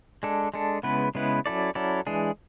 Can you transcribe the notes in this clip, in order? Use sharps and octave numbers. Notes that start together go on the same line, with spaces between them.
G#3 D4 A4
G#3 D4 A4
C#3 G#3 B3 E4 B4
C#3 G#3 B3 E4 B4
F#3 C#4 E4 A4 D5
F#3 C#4 E4 A4 D5
E3 G#3 D4 G#4